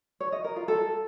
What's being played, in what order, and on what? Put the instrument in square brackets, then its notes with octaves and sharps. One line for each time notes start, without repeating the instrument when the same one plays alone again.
[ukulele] C#5
D#5
A#4
F4
A4